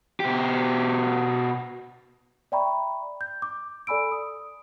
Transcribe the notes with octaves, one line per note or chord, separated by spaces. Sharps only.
B2 G4
D5 E5 G5 A#5 B5 C#6
G6
D6
A4 D5 G#5 B5 E6 D7
D#6